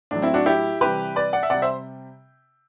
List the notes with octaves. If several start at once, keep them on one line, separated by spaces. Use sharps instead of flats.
A2 F#3 D4
C4 E4
D4 F#4
E4 G4
C3 E3 G3 G4 B4
B4 D5
D5 F#5
E5
C3 G3 D5 F#5
C5 E5